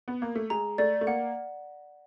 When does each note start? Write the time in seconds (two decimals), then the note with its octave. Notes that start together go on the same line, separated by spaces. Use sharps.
0.08 B3
0.22 A#3
0.35 A3
0.50 G#3 A#5
0.78 A3 D5
1.01 A3
1.07 A#3 F#5